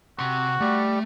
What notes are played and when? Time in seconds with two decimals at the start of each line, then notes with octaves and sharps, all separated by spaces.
0.19 C3 F#4 C6
0.60 G3 A3 G4